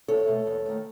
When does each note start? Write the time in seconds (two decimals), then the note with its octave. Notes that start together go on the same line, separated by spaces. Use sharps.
0.08 E2 A4 C#5
0.27 B2 A3
0.47 E2
0.66 D#3 A3